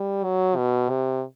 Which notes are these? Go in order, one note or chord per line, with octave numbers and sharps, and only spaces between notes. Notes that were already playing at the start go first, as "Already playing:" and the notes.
Already playing: G3
F#3
B2
C3